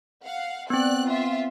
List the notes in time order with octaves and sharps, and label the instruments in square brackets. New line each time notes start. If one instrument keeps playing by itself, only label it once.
[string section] F5 F#5
[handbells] B3 C4 [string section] D5 F#6
[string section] F4 E5